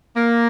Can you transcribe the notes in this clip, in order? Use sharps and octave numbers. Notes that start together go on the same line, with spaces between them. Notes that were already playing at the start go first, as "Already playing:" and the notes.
A#3